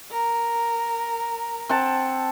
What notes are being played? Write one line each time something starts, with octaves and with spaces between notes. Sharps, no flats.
A#4
C4 F#5 A5